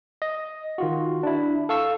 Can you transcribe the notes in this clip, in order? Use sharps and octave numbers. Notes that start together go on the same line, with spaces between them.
D#5
D#3 F4 F#4
D4 E4
A4 F5 C#6 E6